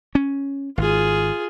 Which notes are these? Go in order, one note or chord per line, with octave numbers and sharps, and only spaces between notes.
C#4
G#1 F4 G#4